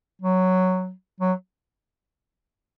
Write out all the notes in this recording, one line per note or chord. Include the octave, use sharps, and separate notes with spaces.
F#3
F#3